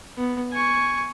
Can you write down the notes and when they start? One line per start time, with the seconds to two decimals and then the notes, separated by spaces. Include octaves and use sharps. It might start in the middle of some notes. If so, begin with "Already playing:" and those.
0.17 B3
0.52 G#5 C#6